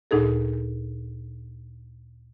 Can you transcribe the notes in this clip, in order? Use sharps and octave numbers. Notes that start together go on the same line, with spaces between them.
D2 A#2 D#4 G#4 A4